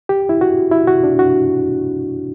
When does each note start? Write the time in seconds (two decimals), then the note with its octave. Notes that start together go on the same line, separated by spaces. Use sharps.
0.09 G4
0.29 E4
0.41 F#4
0.71 E4
0.87 F#4
1.04 D4
1.19 F#4